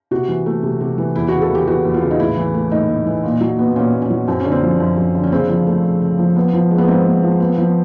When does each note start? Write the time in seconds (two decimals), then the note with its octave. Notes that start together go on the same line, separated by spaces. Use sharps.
0.11 C3 F#4
0.28 E3
0.46 A3
0.63 C3
0.81 C3
0.98 E3
1.16 E2 E4
1.28 C#3 F#4
1.41 A4
1.50 E3 G4
1.68 E2 F#4
1.85 E2
1.94 F4
2.02 C#3
2.11 D#4
2.20 A2 E4
2.37 E3
2.55 A3
2.72 A2 D#4
2.89 A2
3.06 E3
3.24 A#2
3.41 F#3
3.59 B3
3.76 A#2 C#4
3.93 A#2
4.02 C#4
4.10 F#3
4.28 F#2 C4
4.40 C#4
4.45 D3
4.52 C4
4.63 F3
4.80 F#2
4.97 F#2
5.15 D3
5.24 C#4
5.32 C#3 C4
5.49 F3
5.67 A3
5.84 C#3
6.01 C#3
6.19 F3
6.36 B3
6.54 F3
6.71 G#3
6.78 B3
6.88 G#2 C4
7.06 B3
7.23 F3
7.40 B3
7.58 F3